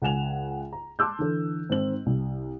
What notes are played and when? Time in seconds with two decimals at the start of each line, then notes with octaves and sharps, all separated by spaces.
0.02 C#2 F#5 G#5 E7 F7
0.73 A#5
0.99 A5 C6 D6 E6 F#6 G6
1.19 D3 E3 A4
1.69 G#2 D#3 C4 F#7
2.06 C2